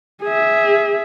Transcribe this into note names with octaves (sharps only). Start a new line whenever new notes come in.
G#4 E5